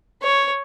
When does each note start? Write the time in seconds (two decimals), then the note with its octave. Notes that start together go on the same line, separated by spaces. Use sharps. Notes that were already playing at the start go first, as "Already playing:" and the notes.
0.22 C#5